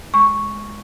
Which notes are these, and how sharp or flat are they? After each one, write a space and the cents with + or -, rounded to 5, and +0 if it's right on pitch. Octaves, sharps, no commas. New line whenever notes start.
G#3 +0 C#6 +0